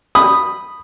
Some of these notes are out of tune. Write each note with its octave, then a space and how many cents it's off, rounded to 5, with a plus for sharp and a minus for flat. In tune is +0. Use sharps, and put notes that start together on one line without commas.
B5 +0 D#6 -10